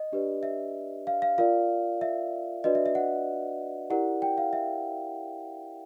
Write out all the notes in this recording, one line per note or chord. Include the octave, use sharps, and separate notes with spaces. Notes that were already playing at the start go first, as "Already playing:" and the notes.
Already playing: D#5
D4 G4 B4 D5
E5
F5
F5
F4 A#4 D5 F5
E5
D4 F#4 B4 D5 D#5
E5
E5
F#5
E4 G4 A#4 D5 F#5
G5
F5
E5